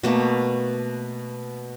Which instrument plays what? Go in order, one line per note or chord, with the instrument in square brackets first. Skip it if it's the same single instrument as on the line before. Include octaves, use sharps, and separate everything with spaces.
[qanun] B2 A3 A#3